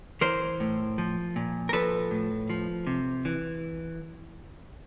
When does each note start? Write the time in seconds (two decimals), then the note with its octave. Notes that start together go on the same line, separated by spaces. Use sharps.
0.21 E3 A#4 C5
0.60 A2
0.98 F3
1.36 A#2
1.69 A#4
1.73 F3 A4 B4
2.11 A2
2.50 F3
2.87 C3
3.25 E3